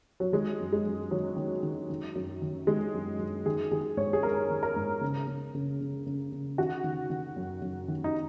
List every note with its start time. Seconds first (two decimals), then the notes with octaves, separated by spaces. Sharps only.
0.20 F#3
0.32 D#3 G#3
0.60 F#2
0.73 G#3
0.86 F#2
1.11 D#3 F#3
1.37 D#3
1.63 D#3
1.90 D#3
2.15 F#2
2.42 D#3
2.67 D#3 G#3
2.94 F#2
3.19 F#2
3.46 D#3 G#4
3.71 D#3 G#4
3.97 G#2 C#5
4.13 G#4
4.23 G#2 A#4
4.50 D#3
4.63 A#4
4.76 G#2
5.01 C#3
5.27 C#3
5.55 C#3
5.81 C#3
6.06 C#3
6.32 C#3
6.58 D#3 F#4
6.84 D#3
7.10 D#3
7.36 F#2
7.62 F#2
7.88 D#3
8.04 D#4